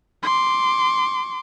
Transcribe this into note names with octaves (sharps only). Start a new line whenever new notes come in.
C6 D6